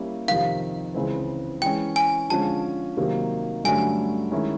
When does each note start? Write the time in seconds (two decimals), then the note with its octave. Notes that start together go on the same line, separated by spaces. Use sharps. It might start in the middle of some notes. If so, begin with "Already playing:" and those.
Already playing: G3 A#3 C#4 E4
0.28 F2 C3 D#3 F5
0.94 C#2 C#3 E3 G#3 C4
1.62 E3 G#3 C#4 G5
1.96 G#5
2.29 D3 F3 G#3 C#4 A5
2.97 C3 D#3 F#3 A#3
3.64 G2 D3 F#3 A3 C#4 G#5
4.32 D#3 G#3 C#4 E4